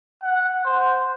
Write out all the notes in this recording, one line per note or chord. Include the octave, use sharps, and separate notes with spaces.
F#5
C5